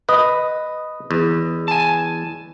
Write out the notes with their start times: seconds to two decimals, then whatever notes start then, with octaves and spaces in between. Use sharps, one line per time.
0.09 B4 D#5 D#6
1.11 E2
1.68 G#5 A5